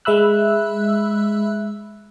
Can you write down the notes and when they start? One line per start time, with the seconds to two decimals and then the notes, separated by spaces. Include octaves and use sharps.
0.05 G#3 E5 B5 E6 F#6